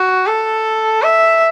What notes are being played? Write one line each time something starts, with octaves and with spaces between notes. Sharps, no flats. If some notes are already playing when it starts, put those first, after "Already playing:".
Already playing: F#4
A4
E5